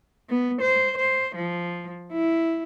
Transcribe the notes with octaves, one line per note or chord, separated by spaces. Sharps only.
B3
C5
C5
F3
E4